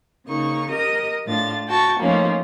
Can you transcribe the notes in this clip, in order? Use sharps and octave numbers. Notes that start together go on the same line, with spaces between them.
C#3 A#3 D#4 C#6
G4 A#4 D#5 D#6
A2 D4 F4 A6
F#4 G5 A5 C#6
F3 A3 A#3 C#4 D#4 F4